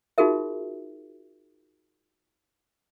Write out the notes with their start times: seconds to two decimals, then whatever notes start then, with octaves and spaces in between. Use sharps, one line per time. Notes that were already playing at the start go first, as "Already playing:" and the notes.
0.18 D#4 F4 F#4 G#4 A#4 E5